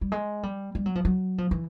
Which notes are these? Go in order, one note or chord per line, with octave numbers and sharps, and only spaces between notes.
G3
G#3
G3
G3
F#3
F3
F#3
F3
E3